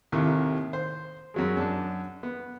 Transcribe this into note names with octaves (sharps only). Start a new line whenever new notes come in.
D#2 A2 C3 D#3
C5
F#2 F#3 G#3
F#2 D4 A5
B3